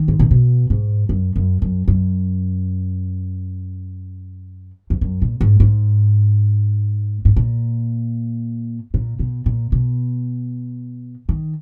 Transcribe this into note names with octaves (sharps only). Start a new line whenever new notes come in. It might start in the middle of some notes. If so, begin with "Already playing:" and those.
Already playing: D#3
G#2
A#2
B2
G#2
F#2
F#2
F#2
F#2
F2
F#2
A#2
G#2
G#2
G#2
A#2
A#2
B2
A#2
B2
D#3